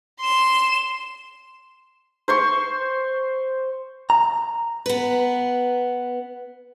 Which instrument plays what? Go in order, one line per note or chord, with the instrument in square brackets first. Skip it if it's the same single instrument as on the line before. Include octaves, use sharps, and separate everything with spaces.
[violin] C6 E7
[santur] C5 C6 C#6
[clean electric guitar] A#5
[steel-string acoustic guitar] B3 B4